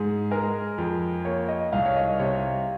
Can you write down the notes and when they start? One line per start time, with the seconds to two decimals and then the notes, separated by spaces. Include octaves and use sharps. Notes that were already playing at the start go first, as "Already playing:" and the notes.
Already playing: G#2 G#4
0.31 G#3 A#4
0.78 F2
1.25 A#3 C#5
1.48 D#5
1.72 C2 F5
1.86 C#5
1.96 D#5
2.19 C3 C#5